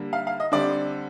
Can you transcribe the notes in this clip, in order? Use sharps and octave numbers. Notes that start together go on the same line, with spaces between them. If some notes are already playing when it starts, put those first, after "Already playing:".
Already playing: D3 G3 A#3
F5
F5
D#5
D3 G3 C4 D5